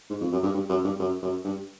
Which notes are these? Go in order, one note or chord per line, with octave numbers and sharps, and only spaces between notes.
G#2
F2
F#2
G2
G2
F#2
G2
F#2
F#2
G2